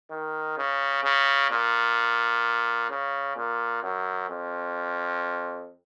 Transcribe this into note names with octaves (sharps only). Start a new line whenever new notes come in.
D#3
C#3
C#3
A#2
C#3
A#2
F#2
F2